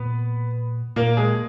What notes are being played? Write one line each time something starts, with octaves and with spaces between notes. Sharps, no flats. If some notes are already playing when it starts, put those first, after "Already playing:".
Already playing: A#2 B3 B4
A#2 A#3 A#4
G#3 G#4